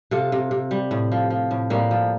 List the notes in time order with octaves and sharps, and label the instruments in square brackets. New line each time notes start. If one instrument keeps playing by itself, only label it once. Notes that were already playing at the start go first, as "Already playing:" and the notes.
[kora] C3 F4 A4
C3
C3
G3
A2
F3
F3
A2
A2 G3 A#3
F3